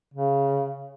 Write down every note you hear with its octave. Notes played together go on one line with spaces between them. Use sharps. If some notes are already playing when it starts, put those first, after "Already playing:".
C#3